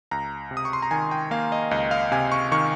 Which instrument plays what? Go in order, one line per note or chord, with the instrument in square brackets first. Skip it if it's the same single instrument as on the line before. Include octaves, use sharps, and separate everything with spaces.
[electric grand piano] C#2 A#5
C3
D#6
C#6
C6
A#5
D#3 G#5
G5
A#3 F5
D#5
C#2 D#5
F5
C3 G#5
C#6
D#3 C#6